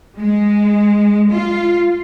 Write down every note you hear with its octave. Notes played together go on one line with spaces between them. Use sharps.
G#3
F4